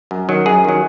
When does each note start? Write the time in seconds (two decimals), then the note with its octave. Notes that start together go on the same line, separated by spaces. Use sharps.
0.11 F#2
0.29 D#3 F#3
0.46 F#2 G#4
0.65 D#3 F#3